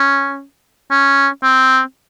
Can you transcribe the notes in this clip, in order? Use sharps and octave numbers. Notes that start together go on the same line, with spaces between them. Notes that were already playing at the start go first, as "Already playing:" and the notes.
Already playing: C#4
C#4
C4